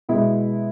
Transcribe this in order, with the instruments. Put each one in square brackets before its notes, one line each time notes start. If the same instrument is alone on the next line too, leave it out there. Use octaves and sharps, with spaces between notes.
[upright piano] B2 G#3 B3 E4